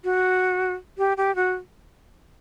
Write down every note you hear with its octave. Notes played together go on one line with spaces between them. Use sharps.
F#4
G4
G4
F#4